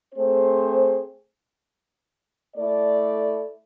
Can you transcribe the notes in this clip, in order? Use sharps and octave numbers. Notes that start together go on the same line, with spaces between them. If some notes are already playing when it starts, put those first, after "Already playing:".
A3 C4 G#4 C5
A3 E4 A4 D5